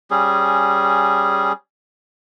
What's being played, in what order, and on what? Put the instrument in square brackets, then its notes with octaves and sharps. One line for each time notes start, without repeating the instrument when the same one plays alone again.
[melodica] G3 C#4 G#4